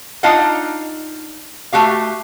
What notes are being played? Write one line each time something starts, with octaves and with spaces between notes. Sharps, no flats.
D4 D#4 F4 D#5 F5 F#5
A3 F#4 G4 F5